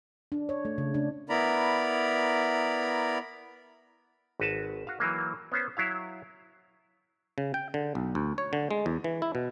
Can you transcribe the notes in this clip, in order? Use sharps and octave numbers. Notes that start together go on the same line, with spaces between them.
D4
C#5
A3
C#3
D4
B3 E4 A#4 D5 A#5 B5
G#1 F#4 B4 A5
F#4 F5
E3 F#3 A#3
B3 C#4 C5
F#3 E4 F5
C#3
G5
D3
B1
D2
C#5
D3
G#3
E2
E3
E4
B2